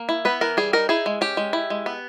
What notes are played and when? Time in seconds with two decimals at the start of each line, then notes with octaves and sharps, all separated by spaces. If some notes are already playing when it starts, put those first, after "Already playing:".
Already playing: A#3
0.09 E4
0.25 B3 B4
0.41 E3 A#4
0.57 G3 G#4
0.73 D#4 A#4
0.89 E4 G#4
1.06 G#3
1.21 C#4 G4
1.37 G#3
1.53 E4
1.70 G#3
1.86 B3